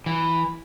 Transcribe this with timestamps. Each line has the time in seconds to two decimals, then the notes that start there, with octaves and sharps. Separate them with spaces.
0.06 E3